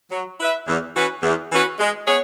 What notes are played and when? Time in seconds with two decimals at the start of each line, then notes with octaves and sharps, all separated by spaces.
0.11 F#3
0.39 E4 B4 E5
0.67 E2
0.95 E3 C#4 F#4 B4
1.23 E2
1.51 E3 C#4 F#4 B4
1.80 G#3
2.07 B3 G#4 C#5